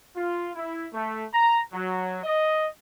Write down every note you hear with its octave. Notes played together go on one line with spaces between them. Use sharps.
F4
E4
A3
A#5
F#3
D#5